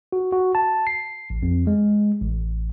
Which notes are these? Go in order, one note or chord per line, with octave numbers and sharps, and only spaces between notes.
F#4
F#4
A5
C7
A1
F2
G#3
A1